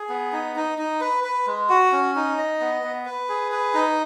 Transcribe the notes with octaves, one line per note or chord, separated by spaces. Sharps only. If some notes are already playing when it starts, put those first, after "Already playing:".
Already playing: G#4
B3
D#4
D#4
D#4
B4
B4
G#3
F#4
C#4
D#4
D#5
B3
B3
B4
G#4
B4
D#4